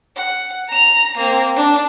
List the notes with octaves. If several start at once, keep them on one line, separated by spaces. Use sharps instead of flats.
F#5
A#5 F7
A#3 C4
D4